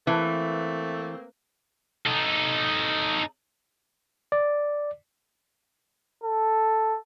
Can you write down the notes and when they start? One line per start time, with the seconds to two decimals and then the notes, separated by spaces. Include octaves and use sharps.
0.07 E3 A3 A#3 C4
2.07 D#4 A4
4.32 D5
6.24 A4